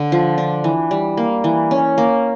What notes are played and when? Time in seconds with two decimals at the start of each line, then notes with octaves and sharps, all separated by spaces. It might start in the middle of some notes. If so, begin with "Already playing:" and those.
Already playing: D3
0.12 F3
0.38 D4
0.64 E3
0.91 G3
1.17 A#3
1.44 E3
1.71 C#4
1.98 A#3